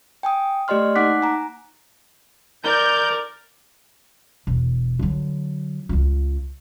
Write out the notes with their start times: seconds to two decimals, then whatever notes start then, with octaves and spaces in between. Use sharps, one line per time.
0.23 G5 G#5 D#6
0.68 A3 G4 D5 D#5 C6 F6
0.95 A#3 D#4 F#5 D6 F#6 B6
1.22 G#5 A#5
2.64 A#4 D5 G6
4.47 E1
4.99 D3 F#3
5.89 C#2 F4